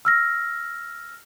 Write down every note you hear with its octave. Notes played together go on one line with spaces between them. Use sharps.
E6 F6 A#6